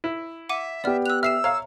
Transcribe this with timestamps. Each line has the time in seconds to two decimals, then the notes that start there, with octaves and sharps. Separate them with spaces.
0.04 E4
0.49 E5 F#5 D6 D#7
0.84 B3 G4 D5 F6
1.06 E6 F#6 F7
1.23 E5 E6 F6 C7 E7
1.44 C#5 F5 A#5